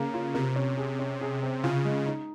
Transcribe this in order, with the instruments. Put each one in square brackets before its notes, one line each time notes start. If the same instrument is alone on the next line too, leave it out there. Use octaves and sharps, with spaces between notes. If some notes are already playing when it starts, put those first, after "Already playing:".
Already playing: [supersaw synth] C#3 [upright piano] A#3
[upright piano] F4
[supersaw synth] C3 [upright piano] A#4
[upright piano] C#4
G#4
C#4
G#4
C4
[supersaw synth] C#3 [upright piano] F4
[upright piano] G#3
D#4